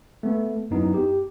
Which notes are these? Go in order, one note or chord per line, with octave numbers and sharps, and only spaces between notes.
A3 B3
F#2 F#3 B3 D#4 E4
G4